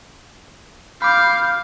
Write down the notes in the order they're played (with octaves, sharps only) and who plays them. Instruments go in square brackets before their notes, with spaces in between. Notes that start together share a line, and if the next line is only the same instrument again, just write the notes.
[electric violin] F5 [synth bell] B5 D6 [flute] G6